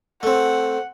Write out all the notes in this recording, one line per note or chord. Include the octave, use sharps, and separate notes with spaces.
A3 C4 F#5